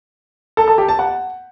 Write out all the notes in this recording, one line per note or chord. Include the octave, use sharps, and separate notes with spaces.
A4
A4
G4
A5
F#5